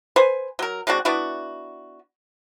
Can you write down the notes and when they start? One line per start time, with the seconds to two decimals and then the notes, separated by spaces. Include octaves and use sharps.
0.16 B4 C5 G#5
0.59 F#3 A#4
0.87 G#3 C4 D4 F#4
1.05 B3 D4 E4 F#4